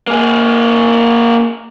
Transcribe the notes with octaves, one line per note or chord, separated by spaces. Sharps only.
A#3 G#4